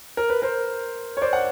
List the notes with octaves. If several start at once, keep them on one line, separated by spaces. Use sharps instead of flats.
A#4
B4
A#4 C5
C#5
C5 D5
F#5